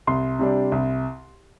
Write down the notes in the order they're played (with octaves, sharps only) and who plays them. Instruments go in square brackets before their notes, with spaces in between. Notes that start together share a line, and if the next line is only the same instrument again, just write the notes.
[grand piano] C2 C6
C3 G3 D4
C2